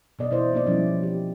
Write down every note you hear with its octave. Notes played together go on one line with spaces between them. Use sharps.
B2 B3 D5 D#5
B2 E3 E4 C5 D5 D#5
A#3 D#4 D5
B2 F3 G3 C#4 E4
G4